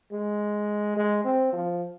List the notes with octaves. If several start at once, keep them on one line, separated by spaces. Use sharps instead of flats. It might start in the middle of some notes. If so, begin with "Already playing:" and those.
G#3
G#3
C4
F3